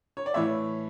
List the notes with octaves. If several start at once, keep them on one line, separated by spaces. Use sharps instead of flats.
C#5
D5
A2 E3 C#5 E5